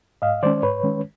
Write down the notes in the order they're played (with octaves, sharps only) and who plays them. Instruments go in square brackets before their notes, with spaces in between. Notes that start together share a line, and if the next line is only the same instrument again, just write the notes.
[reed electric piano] G#2 D#5 F5
D#3 G#3 C#4 C5 D5
G#2 B4 C#5
D#3 G#3 C#4